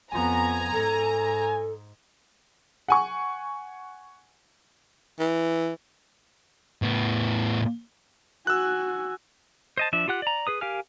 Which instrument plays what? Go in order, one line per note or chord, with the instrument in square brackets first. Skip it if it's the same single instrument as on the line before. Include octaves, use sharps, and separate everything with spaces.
[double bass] F2 B3 [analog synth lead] G#5 [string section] A#5
[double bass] G#2 [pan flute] A4
[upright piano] F#5 G#5 C#6
[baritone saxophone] E3
[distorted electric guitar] A2 B3
[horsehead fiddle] F#4 G#5 [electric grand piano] E6 F#6
[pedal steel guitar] C5 D#5 A5
F3 D4 E5
F4 G4 F#5 F#6
D5 A#5
G#4 B4 D#6
G4 A#4 F5 G#5 F6